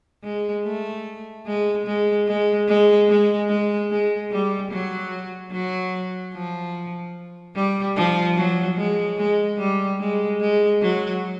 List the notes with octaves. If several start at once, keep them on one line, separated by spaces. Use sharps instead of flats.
G#3
A3
G#3
G#3
G#3
G#3
G#3
G#3
G#3
G3
F#3
F#3
F3
G3
F3
F#3
G#3
G#3
G3
G#3
G#3
F#3